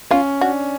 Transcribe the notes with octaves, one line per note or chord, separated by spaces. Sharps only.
C#4 F4
D4 F#4